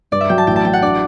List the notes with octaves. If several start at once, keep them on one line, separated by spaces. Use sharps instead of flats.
G2 D5
E5
F#3 G5
A5
A1 G5
A5
F#3 G5
F#5
D4 D5